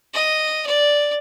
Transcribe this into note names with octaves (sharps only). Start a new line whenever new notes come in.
D#5
D5